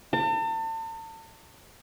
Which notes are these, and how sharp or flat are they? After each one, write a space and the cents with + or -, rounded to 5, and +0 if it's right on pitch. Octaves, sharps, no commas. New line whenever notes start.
A5 +40